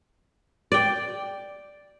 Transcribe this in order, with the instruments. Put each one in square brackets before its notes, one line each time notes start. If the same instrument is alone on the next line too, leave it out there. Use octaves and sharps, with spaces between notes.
[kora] D5 G5